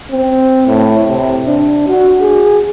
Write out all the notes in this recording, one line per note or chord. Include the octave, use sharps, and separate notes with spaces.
C4
A2
C3
D4
F#4
G#4